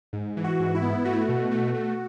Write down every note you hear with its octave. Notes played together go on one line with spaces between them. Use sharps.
G#2
E3
F#4
G#2
E4
B3
A3 F#4
E4
F#4
B2
A3
A3